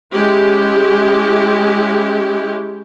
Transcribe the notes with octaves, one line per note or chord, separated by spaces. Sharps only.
G#3 C#4 E4 G4